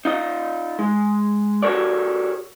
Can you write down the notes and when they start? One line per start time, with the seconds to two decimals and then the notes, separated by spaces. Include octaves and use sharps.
0.05 D#4 F4 D#5
0.79 G#3
1.63 F#4 G4 A4 A#4 C#5 D5